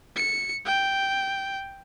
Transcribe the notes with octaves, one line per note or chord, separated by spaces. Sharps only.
C#7
G5